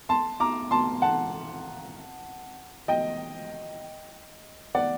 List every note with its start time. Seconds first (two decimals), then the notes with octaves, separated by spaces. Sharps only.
0.09 A5 C6
0.40 A#5 D6
0.71 A5 C6
1.02 F#5 A5
2.88 D#5 G5
4.75 D5 F#5